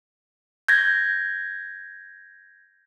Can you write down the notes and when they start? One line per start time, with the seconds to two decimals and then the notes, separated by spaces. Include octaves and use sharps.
0.68 G6 G#6 A#6